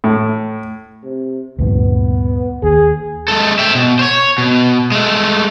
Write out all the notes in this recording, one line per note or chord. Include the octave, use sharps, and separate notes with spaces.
A2
C3
D2 G2 A#2 B3
D#2 G#4
G#3 A4
E5 G5
B2
C5 C#5
B2
G#3 A3